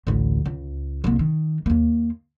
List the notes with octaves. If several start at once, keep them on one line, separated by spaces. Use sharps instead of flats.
A1 D2
C#2
C2 A#3
D#3
D#2 A#3